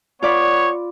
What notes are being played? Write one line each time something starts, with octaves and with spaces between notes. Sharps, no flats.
B3 F4 C#5 D5 B5